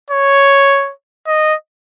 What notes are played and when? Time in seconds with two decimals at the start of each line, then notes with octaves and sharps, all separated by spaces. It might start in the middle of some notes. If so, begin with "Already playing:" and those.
0.10 C#5
1.27 D#5